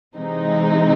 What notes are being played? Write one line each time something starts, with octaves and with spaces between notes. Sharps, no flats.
C3 E3 G#3 C4 D#4